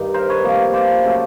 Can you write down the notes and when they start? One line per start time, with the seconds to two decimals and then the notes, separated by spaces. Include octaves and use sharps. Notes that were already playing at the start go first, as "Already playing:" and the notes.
Already playing: G2 D#3
0.14 A#4 C5
0.29 B4 C#5
0.44 C3 F3 A#3
0.73 C5 D5
1.03 C#3 F#3 A3